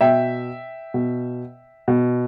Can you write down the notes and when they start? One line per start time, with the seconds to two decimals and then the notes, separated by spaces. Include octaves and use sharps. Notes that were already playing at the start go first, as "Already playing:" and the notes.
0.01 B2 E5 G5
0.94 B2
1.88 B2